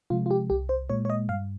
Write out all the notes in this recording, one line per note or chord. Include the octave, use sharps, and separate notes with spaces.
C3 F3 G#3 F4
F4
G4
C2 G4
C5
A#2 G#3 C#5
C#5
D#5
G2 F5